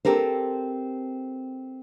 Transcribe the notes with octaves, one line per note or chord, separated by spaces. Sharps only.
C4 G4 A4 A#4 C5